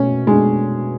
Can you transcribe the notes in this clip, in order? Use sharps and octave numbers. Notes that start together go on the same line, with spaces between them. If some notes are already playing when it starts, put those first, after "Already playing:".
Already playing: B2 A3 C#4
B2 G#3 A3 D4